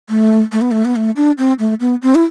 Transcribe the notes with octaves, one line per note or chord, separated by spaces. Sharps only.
A3
A3
B3
A3
B3
A3
D4
C4
A3
B3
C4
E4